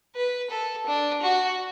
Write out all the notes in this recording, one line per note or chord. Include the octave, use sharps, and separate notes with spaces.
B4
A4
D4
F#4